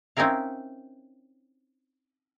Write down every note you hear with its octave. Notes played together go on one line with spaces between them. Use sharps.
C4 C#4 D#4 E4 A#4 F5